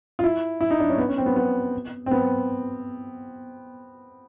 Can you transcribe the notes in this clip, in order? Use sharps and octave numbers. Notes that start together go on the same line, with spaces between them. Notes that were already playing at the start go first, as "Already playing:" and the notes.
F4
E4
E4
D#4
D4
C#4
B3
C#4
C4
B3
B3
C4
B3